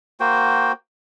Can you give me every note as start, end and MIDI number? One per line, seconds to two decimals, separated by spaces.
0.20 0.72 58
0.20 0.72 66
0.20 0.72 72
0.20 0.72 79